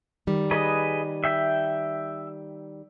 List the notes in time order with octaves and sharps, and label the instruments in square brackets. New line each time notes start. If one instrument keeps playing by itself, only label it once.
[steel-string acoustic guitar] D#3 G3
[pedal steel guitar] G#4 B4 D#5
E5 G5